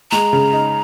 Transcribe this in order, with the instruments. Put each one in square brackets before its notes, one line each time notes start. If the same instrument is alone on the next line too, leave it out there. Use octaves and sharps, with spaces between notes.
[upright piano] G#3 [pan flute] A#5
[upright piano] C#3
D#4